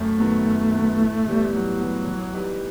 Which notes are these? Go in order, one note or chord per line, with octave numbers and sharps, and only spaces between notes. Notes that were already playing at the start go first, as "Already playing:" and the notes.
Already playing: F#2 A3
D#3 F#3 B3
F#2
D#3 F#3 B3
A2
E3 G3 B3
A2 F#3
E3 G3 B3
E3
G3 D#4 G4 B4